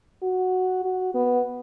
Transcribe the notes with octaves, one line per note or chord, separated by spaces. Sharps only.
F#4
F#4
B3